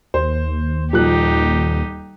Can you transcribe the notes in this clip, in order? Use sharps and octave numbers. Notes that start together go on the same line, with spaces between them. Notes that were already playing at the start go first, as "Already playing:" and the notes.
D#2 C5
D#1 F3 D#4 G4 F#6